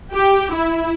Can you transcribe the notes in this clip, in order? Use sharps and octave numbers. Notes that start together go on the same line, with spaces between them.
G4
E4